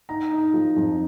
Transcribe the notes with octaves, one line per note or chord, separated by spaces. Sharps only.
D#4 A#5
D#4
F3
F2